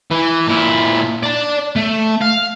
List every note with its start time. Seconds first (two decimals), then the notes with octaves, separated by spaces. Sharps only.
0.11 E3
0.48 A#2 E4
1.23 D5 A5
1.76 A3
2.22 F5